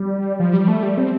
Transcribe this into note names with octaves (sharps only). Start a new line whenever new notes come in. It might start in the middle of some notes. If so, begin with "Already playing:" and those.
Already playing: G3
F3
G3
A3
G3
C4